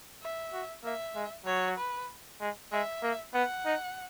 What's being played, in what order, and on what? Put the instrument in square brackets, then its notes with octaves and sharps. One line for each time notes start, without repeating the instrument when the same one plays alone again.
[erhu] E5
[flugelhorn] F#4
[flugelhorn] A#3 [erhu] E5
[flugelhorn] G#3
[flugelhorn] F#3 [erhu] C#5
[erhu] B4
[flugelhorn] G#3
[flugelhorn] G#3 [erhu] E5
[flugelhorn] A#3
[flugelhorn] B3 [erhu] F#5
[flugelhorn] D#4